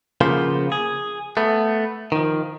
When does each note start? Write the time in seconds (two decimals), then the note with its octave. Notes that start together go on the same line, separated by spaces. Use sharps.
0.21 C#3 F3 A#3 B3 F4 C5
0.72 G#4
1.37 A3 B3
2.12 D#3 F3